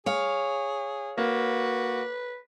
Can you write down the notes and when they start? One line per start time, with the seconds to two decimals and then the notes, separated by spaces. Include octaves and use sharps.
0.06 G#4 C#5 F5
1.18 A#3 F#4 B4